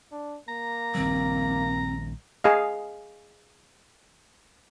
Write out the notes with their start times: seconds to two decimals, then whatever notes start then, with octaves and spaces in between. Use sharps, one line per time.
0.11 D4
0.48 A#3 A#5
0.95 A#1 D#3 G3 C4
2.44 G#4 D#5 F5